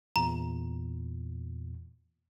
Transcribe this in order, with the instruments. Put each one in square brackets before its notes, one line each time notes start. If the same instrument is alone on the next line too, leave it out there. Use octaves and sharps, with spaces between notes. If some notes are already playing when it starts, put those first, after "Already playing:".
[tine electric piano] E2 A#2 [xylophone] A#5